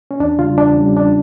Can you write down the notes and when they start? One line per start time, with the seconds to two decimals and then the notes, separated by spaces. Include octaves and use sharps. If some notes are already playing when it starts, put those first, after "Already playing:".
0.11 C#4
0.20 E2 D4
0.39 C#3 G3 F4
0.58 E2 D4
0.77 C#3 G3 C#4
0.96 E2 D4